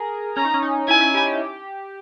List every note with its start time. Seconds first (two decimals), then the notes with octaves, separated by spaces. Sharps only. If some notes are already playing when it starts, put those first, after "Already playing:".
Already playing: G#4 A#4
0.36 C#4 A#5
0.45 D#4
0.54 C#4
0.62 D#4
0.88 E4 G#5
1.01 E4
1.14 G4
1.27 G4